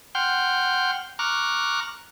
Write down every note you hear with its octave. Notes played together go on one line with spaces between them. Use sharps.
F#5 G5 C6 F6 G6
A#5 C#6 D6 F6 F#6